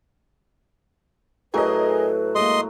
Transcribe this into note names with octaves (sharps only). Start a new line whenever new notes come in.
A2 F#3 G#4 A#4 B4 D#5
G#3 A#3 D#5 C6